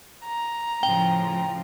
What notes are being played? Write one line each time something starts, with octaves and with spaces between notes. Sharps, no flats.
A#5
A2 C#3 F3 G5